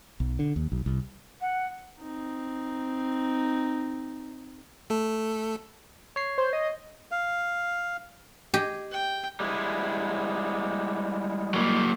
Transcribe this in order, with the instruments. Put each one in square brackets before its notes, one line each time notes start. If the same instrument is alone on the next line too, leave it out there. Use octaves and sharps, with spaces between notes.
[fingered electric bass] B1
D3
D#2
B1
C2
[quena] F#5
[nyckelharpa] C4 D#4
[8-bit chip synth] A3 A4
[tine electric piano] C#5 C7
[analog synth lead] C5
D#5
[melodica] F5
[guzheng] G4 G#4 D#5
[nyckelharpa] G5
[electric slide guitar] G3 G#3 E4
[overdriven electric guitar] F#3 A#3